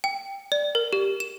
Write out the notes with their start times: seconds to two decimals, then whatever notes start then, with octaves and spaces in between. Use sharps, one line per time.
0.04 G5
0.52 D5
0.75 A#4
0.93 G4
1.20 E7